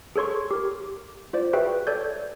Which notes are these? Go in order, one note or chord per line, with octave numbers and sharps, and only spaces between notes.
G#4 A4 C#5 C6 C#6
G4 A#4
F4 C5 D5
F#4 G#4 B4 E5 G5
A4 C#5 D5 G6